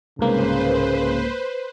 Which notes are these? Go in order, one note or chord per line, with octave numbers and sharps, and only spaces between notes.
C2 G#2 C#3 A#3 B4 C5